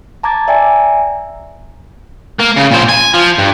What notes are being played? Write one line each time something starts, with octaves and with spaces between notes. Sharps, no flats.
A5 A#5 D6 G#6 A6
D5 E5 G5 G#5 A#5
A#3
C#3
A#2 C5
G#5
F3
G2